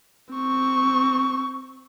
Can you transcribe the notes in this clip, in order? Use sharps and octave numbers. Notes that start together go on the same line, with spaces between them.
C4 C#6